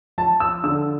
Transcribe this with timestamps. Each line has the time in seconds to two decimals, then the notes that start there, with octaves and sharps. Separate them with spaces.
0.18 F3 A5
0.40 E6
0.64 D3 E6